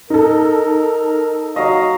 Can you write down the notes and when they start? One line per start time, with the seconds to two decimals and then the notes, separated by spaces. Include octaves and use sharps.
0.10 D#4 A4 A#4
1.56 F#3 D#5 F5